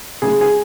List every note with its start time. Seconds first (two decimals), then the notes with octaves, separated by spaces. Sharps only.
0.22 C#3 G#3 G#4
0.41 G#4